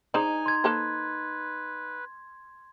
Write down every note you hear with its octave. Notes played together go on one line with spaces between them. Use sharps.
D#4 G#4 C5 D5 G#5
C6 G#6
A#3 A4 B4 C5